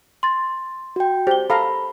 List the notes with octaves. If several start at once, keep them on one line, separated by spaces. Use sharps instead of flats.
C6 A6
F#4 G5
G4 C5 G7
A4 F5 A#5 B5